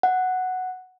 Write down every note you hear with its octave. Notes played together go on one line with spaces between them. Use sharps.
F#5